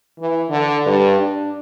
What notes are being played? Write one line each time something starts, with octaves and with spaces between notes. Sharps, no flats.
E3
D3
G2
D4